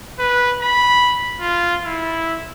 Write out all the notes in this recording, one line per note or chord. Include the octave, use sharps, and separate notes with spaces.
B4
B5
F4
E4